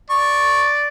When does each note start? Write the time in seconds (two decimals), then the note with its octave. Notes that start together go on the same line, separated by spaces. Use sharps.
0.10 D5 C#6